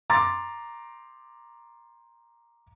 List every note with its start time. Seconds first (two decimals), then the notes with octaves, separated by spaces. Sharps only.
0.10 A#5 C6 D6 A6